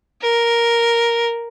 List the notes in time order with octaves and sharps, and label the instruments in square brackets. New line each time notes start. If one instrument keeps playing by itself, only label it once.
[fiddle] A#4